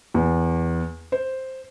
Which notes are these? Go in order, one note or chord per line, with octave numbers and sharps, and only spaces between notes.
E2
C5